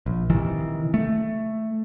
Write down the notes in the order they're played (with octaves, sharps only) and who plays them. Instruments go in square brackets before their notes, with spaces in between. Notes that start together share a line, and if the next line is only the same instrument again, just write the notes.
[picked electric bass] A#1
C3 D#3 E3
A3